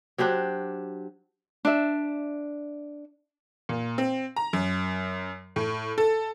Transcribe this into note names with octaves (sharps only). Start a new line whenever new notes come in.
F#3 D4 G4 C5
D4 E5
A#2
C4
A#5
F#2
A2
A4